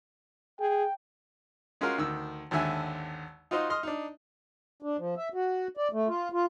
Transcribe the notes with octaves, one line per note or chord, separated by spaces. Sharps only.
G#4 G5
G#3 C#4 F4 F#4 A#4 F5
D2 D#3 E6
G#1 D#2 D3 E5 G#5
D#4 F4 F#4 C5 D#5
D#5 C6 D#6 F6
D4 D#4
D4
F3
E5
F#4
D5
A3
F4
F4